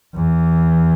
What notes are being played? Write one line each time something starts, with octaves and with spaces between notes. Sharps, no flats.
E2